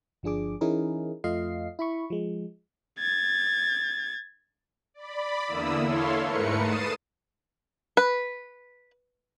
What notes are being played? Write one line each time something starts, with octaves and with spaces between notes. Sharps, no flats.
G1 F3 D4 G#4 D6
E3 C#4 D#4 E4 G#4 A#4
F2 A3 F4 D#5 F5 C7
E4 B5 C#6
F3 G#3
G#6 A6
D5 B5
E2 D3 A#3 E4 D#6 E6
E4 A4 C#5 F5 C6
G#2 A3 A#4 B4 C#7
D#6 A6 C7 D#7 E7
B4